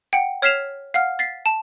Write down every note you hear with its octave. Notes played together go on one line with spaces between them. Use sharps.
F#5 G5
C#5 F6 B6 C7 E7 F7
F5 F#5 F6
A6 B6 C7
A5